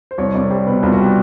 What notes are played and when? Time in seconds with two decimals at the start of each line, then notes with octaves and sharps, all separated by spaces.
0.11 C5
0.18 C2 C#5
0.34 C2 D5
0.50 G3 C5
0.66 B2 B4
0.83 C2 F4
0.92 F#4
1.00 G4